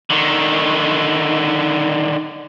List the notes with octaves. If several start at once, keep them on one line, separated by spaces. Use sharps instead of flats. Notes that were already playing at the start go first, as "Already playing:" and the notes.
D3 D#3